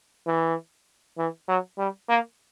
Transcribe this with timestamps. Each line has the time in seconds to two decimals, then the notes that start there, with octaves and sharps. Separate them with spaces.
0.27 E3
1.18 E3
1.48 F#3
1.78 G3
2.09 A#3